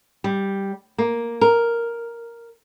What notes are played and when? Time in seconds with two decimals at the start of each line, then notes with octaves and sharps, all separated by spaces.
0.24 G3
0.98 A#3
1.41 A#4